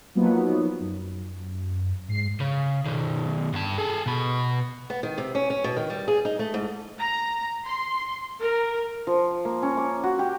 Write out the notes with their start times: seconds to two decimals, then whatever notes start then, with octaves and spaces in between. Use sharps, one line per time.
0.15 F3 F#3 A#3 B3 D#4
0.81 F#2
2.08 G#2 C7
2.40 C#3
2.85 B2 D#3
3.54 G2 A5
3.78 G#4 A4
4.06 B2 B4
4.90 B3
5.03 D#3
5.18 C3
5.35 C#4
5.50 C#4
5.64 B2
5.77 D#3
5.90 G3
6.08 G#4
6.25 D#4
6.39 A3
6.54 G#2
7.01 A#5
7.65 C6
8.41 A#4
9.07 F3
9.45 A#3
9.62 C#4
9.77 D6
10.04 F#4
10.19 G4